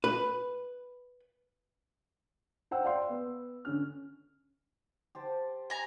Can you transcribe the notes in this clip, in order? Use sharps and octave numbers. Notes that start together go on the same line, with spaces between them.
B4
C5 F#5 G5 E6
D5 F5 G5 C6
B3
D3 C#4 F6
G4 C5 A5
G#5 A#5